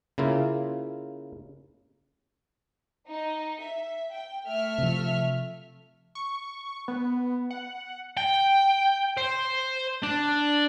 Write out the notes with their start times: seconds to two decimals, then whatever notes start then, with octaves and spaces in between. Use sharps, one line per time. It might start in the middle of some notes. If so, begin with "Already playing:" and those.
0.18 C#3 A#3 E4 F4
3.07 D#4
3.60 E5
4.11 G5
4.47 A3 E5 F6
4.78 C3 F3
6.15 C#6
6.88 B3
7.51 F#5
8.17 G5
9.17 C5
10.03 D4